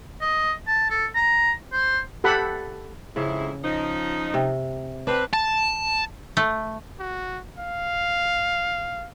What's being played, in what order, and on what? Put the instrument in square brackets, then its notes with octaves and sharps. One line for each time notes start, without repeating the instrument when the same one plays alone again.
[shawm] D#5
A5
A4
A#5
C5
[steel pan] G4 A4 F#5 B5
[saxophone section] F2 G#2 E4 [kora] C#3
[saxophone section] F3 D#4
[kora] C3
[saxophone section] C4 B4 [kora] D4
[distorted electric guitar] A5
[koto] A3
[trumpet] F#4
F5